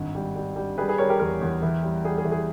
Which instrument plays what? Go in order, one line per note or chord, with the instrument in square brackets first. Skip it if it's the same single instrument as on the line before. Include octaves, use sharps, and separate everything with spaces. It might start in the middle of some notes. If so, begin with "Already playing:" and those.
Already playing: [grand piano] G#1 G2
G3
G3
G3
G3 G#4 B4
G#4 B4
G3 A#4 C#5
G4 A#4
E2 G4 A#4
E2
E3
G3
G3 G#4
G#4
E3
G#4